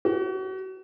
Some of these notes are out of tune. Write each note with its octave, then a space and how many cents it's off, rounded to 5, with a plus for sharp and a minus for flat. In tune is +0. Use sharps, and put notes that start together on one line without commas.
F#4 +35